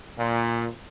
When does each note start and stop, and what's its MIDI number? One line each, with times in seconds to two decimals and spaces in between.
0.18 0.67 46